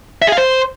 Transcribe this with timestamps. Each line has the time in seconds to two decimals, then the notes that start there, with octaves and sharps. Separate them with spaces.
0.22 E5
0.27 G#4
0.32 F5
0.38 C5